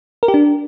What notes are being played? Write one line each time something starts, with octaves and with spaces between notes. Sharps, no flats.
A#4
G4
D4